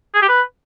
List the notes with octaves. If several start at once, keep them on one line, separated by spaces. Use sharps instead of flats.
G#4
G4
B4